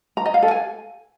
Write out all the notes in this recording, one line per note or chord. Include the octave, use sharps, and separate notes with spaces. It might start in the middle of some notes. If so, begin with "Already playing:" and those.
A#5
D#5
F5
A4
G#5